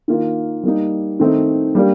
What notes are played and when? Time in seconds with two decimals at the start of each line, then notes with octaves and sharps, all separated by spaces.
0.08 D#3 A#3 F4
0.63 G3 A#3 D#4
1.20 D#3 A3 C4 D#4
1.75 G3 A#3 D4 G4